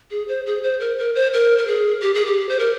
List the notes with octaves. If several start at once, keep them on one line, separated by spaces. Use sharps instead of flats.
G#4
C5
G#4
C5
A#4
A#4
C5
A#4
A#4
G#4
G4
G#4
G4
C5
A#4